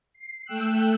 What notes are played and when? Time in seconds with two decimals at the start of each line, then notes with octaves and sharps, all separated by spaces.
0.13 C7
0.45 A3 G5 E6 F#6